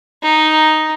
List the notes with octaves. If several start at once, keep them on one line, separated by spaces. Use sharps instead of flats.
D#4